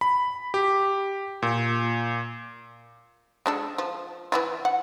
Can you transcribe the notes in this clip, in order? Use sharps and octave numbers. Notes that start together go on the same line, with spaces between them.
B5
G4
A#2
G#3 D4 A4
F3
E3 E4 F4
F#5